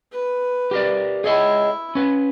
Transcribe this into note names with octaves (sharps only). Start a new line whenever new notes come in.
B4
G4 A#4 D5
E4 G#4 C#5 D#5
C#4 B4